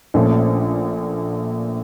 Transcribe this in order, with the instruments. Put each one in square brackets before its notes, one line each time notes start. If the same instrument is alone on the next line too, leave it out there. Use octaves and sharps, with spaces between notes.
[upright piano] A#1 A#2 F3 A3 C#4